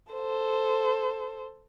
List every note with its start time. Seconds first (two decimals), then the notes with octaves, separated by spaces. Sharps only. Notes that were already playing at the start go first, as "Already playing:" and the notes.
0.12 A4 C5